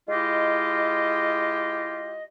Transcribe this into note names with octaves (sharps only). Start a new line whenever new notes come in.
G#3 E4 F4 G4 D#5